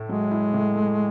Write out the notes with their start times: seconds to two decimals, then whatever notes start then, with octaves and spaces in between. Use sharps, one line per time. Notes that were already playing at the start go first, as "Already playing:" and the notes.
Already playing: A2 A3 E4
0.09 F#3 G#3
0.31 E4
0.54 A2
0.75 A3